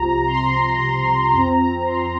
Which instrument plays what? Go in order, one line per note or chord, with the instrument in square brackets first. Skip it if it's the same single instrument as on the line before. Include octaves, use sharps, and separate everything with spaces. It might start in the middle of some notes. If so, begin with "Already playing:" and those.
Already playing: [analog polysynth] C2 C3 F3 A#5
C6
F2 F3 C4 A#5
A#5
C6